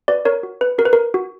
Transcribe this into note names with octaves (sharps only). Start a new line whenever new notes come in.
F#4 B4 D5
A#4 C#5
F#4
B4
F#4 A#4
B4
A#4
F#4